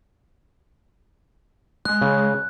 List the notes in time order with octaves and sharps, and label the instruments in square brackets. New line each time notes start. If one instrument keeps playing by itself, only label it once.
[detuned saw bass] G#3 [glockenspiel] F#6
[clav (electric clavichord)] C#3